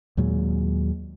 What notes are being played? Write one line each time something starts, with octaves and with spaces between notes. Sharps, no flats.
D#2 A#2 F#3 G#3